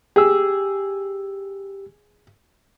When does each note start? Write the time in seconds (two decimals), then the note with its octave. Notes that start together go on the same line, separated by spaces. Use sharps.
0.16 G4 G#4 E6